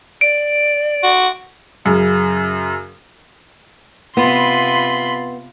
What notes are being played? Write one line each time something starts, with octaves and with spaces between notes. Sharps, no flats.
D5 D7
F#4
F#2 C#3
C3 B3 F4 B5 C6